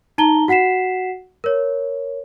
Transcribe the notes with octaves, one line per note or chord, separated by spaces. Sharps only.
D#4 A5 A#5 G7
F#4 F#5 B6 C7 E7
A#4 C#5